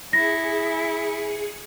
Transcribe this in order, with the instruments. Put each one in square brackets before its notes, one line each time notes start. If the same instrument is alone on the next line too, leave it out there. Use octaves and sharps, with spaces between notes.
[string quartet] E4 [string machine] G#4 C#7 [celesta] A#6